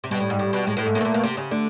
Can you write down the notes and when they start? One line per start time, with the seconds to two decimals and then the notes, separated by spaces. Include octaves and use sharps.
0.04 C3
0.10 B2 G3
0.20 A2
0.30 G#2
0.39 A2
0.53 B2
0.67 A2 G#3
0.77 A2
0.81 A3
0.86 G#2
0.95 A2 A#3
1.01 B2
1.05 A#2
1.14 B2
1.23 C3
1.37 C#3
1.51 D3 A3